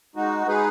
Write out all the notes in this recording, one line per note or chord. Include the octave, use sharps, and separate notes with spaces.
G#3 D#4 F#4
G#3 D#4 G#4 B4